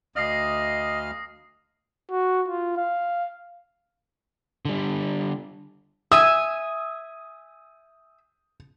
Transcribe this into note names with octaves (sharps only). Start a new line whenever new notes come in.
D2 D#5 F5 D#6 F6 A#6 C7
F#4
F4
F5
D3 G3
E5 G#5 D#6